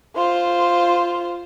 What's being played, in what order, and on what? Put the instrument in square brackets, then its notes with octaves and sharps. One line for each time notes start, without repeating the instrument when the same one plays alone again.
[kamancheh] F4 C5